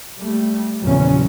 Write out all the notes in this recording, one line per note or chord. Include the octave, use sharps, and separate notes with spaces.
G3 A3
E2 A#2 C#3 F3 F#3 C#4